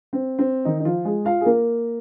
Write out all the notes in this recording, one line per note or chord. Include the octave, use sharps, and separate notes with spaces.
C4
C4
D#3 D#4
D#4
F3 F4
G#3 G#4
F4 F5
G#4
A#3 A#4